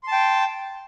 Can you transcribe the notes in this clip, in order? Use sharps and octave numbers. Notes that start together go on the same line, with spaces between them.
G5 A5 C6